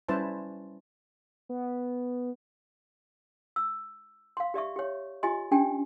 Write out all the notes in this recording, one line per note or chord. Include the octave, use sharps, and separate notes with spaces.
G3 C#4 E4 B4 C5 A5
B3
E6
F5 C6
G4 D5 E5 C#6
G4 C#5
F4 G4 D#5 G#5 C6
C#4 D4 G4 G5 G#5